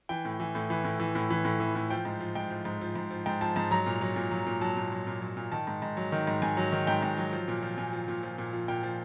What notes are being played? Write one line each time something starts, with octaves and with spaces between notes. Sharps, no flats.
E3 G5
A2
E3
A2
E3
A2
E3
A2
E3
A2
E3
A2
F3 G5
G#2
F3
G#2 G5
F3
G#2
F3
G#2
F3
G#2 G5
F3 A5
G#2 A5
F#3 A#5
A#2
F#3
A#2
F#3
A#2
F#3 A5
A#2
F#3
A#2
F#3
A#2
D#3 A5
G#2
G#2
F#3
D#3
G#2
G#2 G#5
F#3
D#3
G#2 G5
G#2
F#3
F3
A#2
F3
A#2 G#5
F3
A#2
F3
A#2
F3
A#2 G5
F3